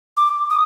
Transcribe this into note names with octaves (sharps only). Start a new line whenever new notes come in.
D6
D#6